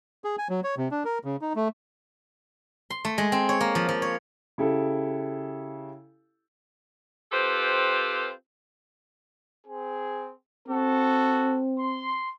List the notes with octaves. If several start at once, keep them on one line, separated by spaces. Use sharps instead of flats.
G#4
G#5
F#3
C#5
C3
D4
A#4
C#3
D#4
A3
C6
A3
G#3
C4
C#5
A#3
F3
F3
C#5
C#3 E4 G4 A4
C4 F4 G4 A4 B4 C5
C4 G#4
C4 F#4 A4
C6